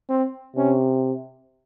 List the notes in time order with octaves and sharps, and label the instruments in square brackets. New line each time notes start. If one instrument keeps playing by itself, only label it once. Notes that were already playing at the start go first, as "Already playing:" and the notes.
[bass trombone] C4
[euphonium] C3 [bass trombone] C#4